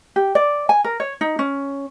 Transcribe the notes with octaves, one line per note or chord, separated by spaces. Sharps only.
G4
D5
G#5
A#4
C#5
D#4
C#4